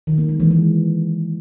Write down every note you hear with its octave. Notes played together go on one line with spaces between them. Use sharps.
D#3
A#3
G#3
E3
G#3